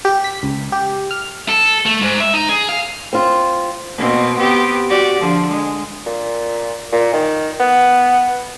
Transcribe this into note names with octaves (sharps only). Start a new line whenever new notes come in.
G4
B6
C#2
G4
F6
A4
A3
G#2
E5
D#4
G#4
F5
C4 F4
B2 A#3 C4
B3 C4 G4
F#4 G4 D5
D3 F3
G#3
A#2
A#2
D#3
B3